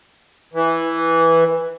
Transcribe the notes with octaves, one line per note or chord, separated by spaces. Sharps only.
E3